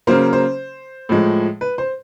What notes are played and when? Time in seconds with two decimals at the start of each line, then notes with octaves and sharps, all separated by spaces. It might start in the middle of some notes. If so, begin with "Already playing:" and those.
0.07 C#3 F#3 A#3 C5
0.33 C5
1.09 A2 F3 G#3
1.61 B4
1.78 C5